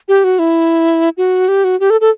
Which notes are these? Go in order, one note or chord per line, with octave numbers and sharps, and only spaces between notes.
G4
F#4
E4
F#4
G4
F#4
G4
A4
A4